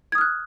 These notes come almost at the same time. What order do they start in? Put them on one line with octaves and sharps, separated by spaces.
G#6 D#6 F6 F#6